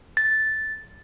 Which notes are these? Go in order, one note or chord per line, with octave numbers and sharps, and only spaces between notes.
A6